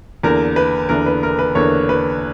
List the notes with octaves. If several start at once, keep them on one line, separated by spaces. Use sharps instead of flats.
E2 D3 A#3 A#4
B4
E2 D3 A#3 A#4
B4
A#4
B4
E2 D3 A#3 C#5
B4